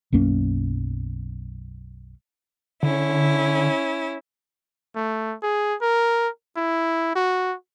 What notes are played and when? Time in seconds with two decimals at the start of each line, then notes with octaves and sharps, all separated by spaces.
0.12 B1 F#2 A#3 C#4
2.83 D3 C#4 E4
4.96 A3
5.43 G#4
5.82 A#4
6.57 E4
7.15 F#4